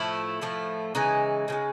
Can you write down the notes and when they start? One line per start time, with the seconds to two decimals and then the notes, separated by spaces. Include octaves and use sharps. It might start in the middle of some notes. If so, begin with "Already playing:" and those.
Already playing: A2 F3 A3 E4
0.41 A2 F3 A3
0.95 C#3 E3 G#3 D#4
1.48 C#3 E3 G#3